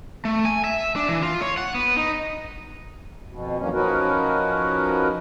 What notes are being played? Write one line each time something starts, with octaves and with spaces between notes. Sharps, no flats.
A3
G#5
E5
D4
E3
F4
C#5
F#5
B3
D#4
F2 B2
E3 F#3 A#3 C#4
F3 C#4 D#4 F#4 A#4 B4